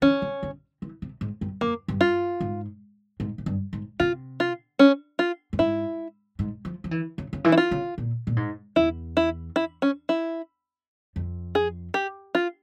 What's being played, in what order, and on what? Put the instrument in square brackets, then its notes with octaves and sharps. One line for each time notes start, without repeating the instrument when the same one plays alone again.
[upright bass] E3 [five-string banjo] C#4
[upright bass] C#3
C#3
E3
C3
G#2
G2
[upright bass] F2 [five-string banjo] A#3
[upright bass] G2
[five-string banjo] F4
[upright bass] G#2
G#2
G#2
G2
G#2
[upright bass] C3 [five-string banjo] F4
[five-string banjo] F4
C#4
F4
[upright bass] G2
[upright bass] G#2 [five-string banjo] E4
[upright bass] G#2
F3
F3
E3
C#3
C#3
E3
[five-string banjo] E4
F4
[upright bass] C#3
A#2
A#2
G#2
[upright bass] E2 [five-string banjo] E4
[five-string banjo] E4
E4
C#4
E4
[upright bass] F2
[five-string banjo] G#4
G4
F4